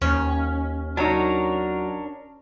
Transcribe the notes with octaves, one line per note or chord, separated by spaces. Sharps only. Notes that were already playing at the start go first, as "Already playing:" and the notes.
D#2 C#4
F#3 D4 D#4 A#4 C#5